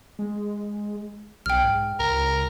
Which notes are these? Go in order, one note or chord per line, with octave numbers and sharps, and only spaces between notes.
G#3
B1 G5 F6
G#2
C#2 A#4